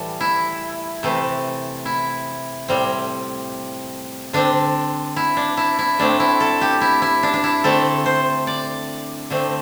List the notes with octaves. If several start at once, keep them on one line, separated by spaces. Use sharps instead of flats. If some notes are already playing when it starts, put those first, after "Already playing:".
Already playing: A2 E3 G3 A4
E4
C3 E3 A3 C4
E4
A2 G3 C4
D3 C4 D4
E4
D4
E4
E4
A2 A3 C4 D4
E4
A4
G4
E4
E4
D4
D4
E4
D3 A3 C4 A4
C5
D5
D3 A3 C4